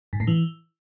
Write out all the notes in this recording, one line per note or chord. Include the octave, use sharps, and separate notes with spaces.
G#2
A2
E3